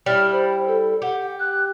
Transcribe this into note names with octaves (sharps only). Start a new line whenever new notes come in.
G3 E4 F6
C5
A4
G4 F#5
F#6